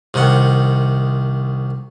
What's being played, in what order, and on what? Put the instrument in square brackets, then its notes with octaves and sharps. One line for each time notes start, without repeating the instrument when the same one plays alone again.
[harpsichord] C2 C3 D#3 F#5